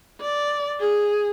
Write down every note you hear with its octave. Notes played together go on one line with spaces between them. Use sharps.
D5
G#4